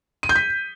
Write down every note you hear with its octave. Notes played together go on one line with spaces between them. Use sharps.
D#7
G6
B6